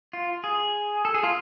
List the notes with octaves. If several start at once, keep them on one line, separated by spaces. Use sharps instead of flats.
F4
G#4
A4
G#4
F4